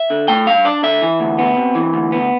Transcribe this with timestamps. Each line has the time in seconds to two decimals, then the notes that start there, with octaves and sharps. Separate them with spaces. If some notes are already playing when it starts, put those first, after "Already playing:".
Already playing: E5
0.10 D3
0.28 A3 G5
0.46 G2 F5
0.65 D4 D5
0.83 D3 E5
1.02 E3
1.20 D2
1.39 B3
1.57 C3
1.75 E3
1.94 D2
2.12 B3